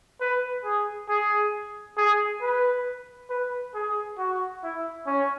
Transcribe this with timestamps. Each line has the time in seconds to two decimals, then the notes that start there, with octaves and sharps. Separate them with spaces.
0.21 B4
0.65 G#4
1.09 G#4
1.98 G#4
2.42 B4
3.30 B4
3.75 G#4
4.18 F#4
4.63 E4
5.07 C#4